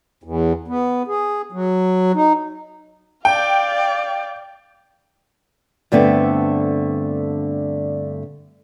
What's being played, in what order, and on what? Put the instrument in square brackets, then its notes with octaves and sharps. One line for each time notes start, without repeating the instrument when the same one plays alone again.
[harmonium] E2
B3
G#4
F#3
D#4
[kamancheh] D5 F5 [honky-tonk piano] G5
[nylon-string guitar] G2 D3 A3 B3 C4